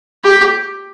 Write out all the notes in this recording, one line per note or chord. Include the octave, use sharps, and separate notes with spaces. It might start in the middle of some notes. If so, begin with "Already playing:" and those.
G4